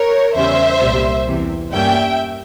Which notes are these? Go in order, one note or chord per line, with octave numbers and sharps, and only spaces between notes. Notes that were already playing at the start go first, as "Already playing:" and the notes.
Already playing: A#4 C#5
E2 C#3 G3 C#4 C5 E5
C2 A#2 G3 C4
E2 C3 E3
G2 G3 A#3 C#4 E5 G5